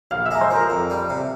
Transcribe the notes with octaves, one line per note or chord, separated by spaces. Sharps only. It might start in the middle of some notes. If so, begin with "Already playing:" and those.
A#1 F5 F6
E5 E6
G#3 A#5
C5 C6
F3 A#4 A#5
F2
G3
C3